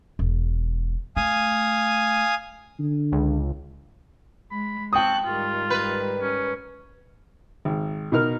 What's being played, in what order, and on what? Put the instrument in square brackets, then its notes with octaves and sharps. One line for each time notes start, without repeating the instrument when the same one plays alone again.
[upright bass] E1
[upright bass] A3 [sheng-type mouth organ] F5 G#5 D#6
[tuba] D3
[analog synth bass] C#2
[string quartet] G#3 [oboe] B5
[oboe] C4 [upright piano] G5 D#6 [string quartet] A5 C#6 F#6
[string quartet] G#2 D#3 G3 [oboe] F4
[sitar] B4
[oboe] C#4
[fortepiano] G#1
B2 D#4 A#4 F6